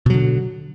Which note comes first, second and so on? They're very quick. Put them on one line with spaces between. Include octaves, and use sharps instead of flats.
B2 F#3 D3